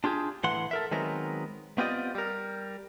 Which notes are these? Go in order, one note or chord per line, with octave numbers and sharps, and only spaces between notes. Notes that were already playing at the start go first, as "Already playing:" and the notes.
D4 F4 G4 G#4
A2 E3 F#5 C6
A4 A#4 E5
D#3 F#3 G#3 B3 C4 A#4
B3 C4 F4 G4 D5 D#5
G3 A#4